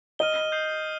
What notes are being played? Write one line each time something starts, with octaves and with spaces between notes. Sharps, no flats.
D#5 F6 D#7 G7
D#6 G6 C7